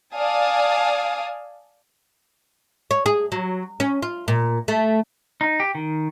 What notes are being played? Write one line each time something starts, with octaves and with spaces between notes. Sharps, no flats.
D5 F5 G#5 A5 D#6
C#5
G#4
F#3
C#4
F4
A#2
A3
D#4
G4
D#3